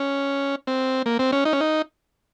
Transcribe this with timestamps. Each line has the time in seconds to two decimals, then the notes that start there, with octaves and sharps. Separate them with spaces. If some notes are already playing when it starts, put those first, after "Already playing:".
Already playing: C#4
0.67 C4
1.06 A#3
1.19 C4
1.32 C#4
1.45 D#4
1.53 C#4
1.61 D#4